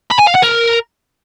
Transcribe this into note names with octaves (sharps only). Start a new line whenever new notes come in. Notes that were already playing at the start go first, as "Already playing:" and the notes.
B5
G#5
F5
F#5
A#4